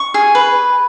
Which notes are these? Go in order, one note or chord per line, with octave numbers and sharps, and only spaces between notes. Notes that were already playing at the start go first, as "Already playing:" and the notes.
Already playing: C#6
G#4
B4